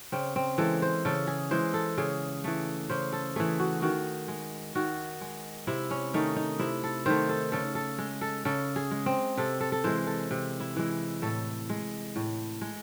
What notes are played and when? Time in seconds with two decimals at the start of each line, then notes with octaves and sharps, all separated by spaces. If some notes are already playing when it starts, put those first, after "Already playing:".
0.12 C#3 C4
0.36 C4
0.58 E3 G#3 A4
0.82 C5
1.05 C#3 A4
1.27 G#4
1.51 E3 G#3 C5
1.74 A4
1.97 C#3 G#4
2.44 E3 A3
2.89 C#3 C5
3.13 A4
3.36 E3 A3 G#4
3.59 F#4
3.82 D#3 F#4
4.28 G#3
4.75 D#3 F#4
5.21 G#3
5.67 C3 E4
5.91 C#4
6.14 D#3 A3 D#4
6.36 D#4
6.59 C3 E4
6.83 A4
7.06 D#3 A3 C5
7.29 A4
7.52 C#3 A4
7.75 A4
7.98 G#3
8.21 A4
8.45 C#3 A4
8.76 G#4
8.91 G#3
9.06 C4
9.37 C3 A4
9.60 A4
9.72 A4
9.84 E3 G#3 C5
10.07 A4
10.31 C3
10.60 E4
10.76 E3 G#3
11.22 A2 A4
11.69 G#3
12.16 A2
12.61 G#3